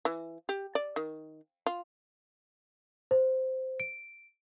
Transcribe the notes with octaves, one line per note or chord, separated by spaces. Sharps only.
E3
G4
D5
D#3
F4
C5
D7